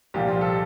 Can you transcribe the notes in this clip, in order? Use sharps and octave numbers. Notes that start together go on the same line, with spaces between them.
C2 A#2 F3 G4
F4
A4